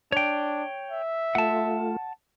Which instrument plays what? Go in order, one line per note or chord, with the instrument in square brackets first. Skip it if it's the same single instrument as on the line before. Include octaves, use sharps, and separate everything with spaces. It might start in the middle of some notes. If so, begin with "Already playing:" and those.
[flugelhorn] D4 [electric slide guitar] C#5 G5
[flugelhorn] E5
[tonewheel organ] A3 F4 [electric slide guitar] F#5 A5